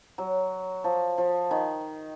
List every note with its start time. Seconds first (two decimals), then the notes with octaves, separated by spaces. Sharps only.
0.18 F#3
0.84 F3
1.18 F3
1.51 D#3